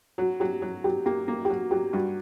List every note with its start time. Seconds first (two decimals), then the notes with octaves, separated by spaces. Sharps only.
0.18 F#3 F#4
0.40 F#3 G4
0.62 F#3 F#4
0.84 F#3 G4
1.06 A#3 G4
1.28 A#3
1.45 G4
1.50 F#3 F#4
1.71 F#3 G4
1.93 G2 F#4